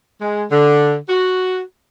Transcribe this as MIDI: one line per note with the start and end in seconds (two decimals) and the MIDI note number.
0.21 0.44 56
0.51 0.95 50
1.09 1.60 66